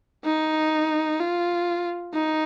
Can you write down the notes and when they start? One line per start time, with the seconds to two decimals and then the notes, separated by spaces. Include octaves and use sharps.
0.25 D#4
1.20 F4
2.15 D#4